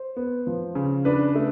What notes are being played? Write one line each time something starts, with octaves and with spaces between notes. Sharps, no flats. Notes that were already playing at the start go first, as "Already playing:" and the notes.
Already playing: C5
B3
F3
C#3
D4 B4
A3